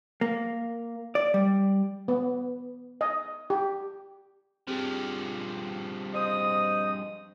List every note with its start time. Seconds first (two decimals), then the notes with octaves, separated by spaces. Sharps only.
0.21 A#3
1.15 D5
1.34 G3
2.08 B3
3.01 D#5
3.50 G4
4.67 G2 F3 C4 G4 G#4
6.14 C5 D#5 D#6